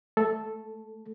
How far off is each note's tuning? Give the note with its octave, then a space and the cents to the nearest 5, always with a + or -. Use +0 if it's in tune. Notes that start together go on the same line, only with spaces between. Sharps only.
A3 +0 A4 -5